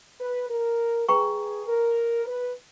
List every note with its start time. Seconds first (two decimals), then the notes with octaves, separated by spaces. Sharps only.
0.21 B4
0.50 A#4
1.08 G#4 B4 G5 A#5 C#6
1.67 A#4
2.26 B4